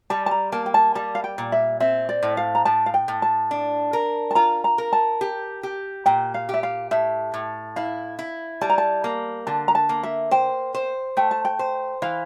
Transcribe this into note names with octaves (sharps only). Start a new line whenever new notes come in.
G3 A5
A5
A#5
A#3 A5
G5
A5
G3 A5
F5
G5
A#2
E5
C4 E5
D5
A2
F5
A#5
A2 A5
F5
G5
A2
A5
D4
A#4
A5
F4 A#5
A#5
A#4
A5
G4
G4
A#2 G5
F5
G4 E5
F5
A2 E5
A2
E4 F5
E4
G3 A5
A#5
A5
A#3
D3 A5
A#5
A5
A#3
E5
C5 G5
C5
A3 G5
A5
G5
C5
E3 F5